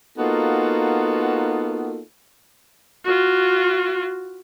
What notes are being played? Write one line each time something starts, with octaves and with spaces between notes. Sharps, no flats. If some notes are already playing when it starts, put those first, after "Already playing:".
A#3 B3 D#4 F4 F#4 A4
F4 F#4